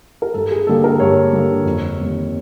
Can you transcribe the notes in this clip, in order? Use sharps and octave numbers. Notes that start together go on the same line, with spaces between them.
A#4
G2 A4
G#4
D3 G3 A#3 A4
A#4
G2 C#5
D3 G3 A#3
F2
C3 D#3 G3 A#3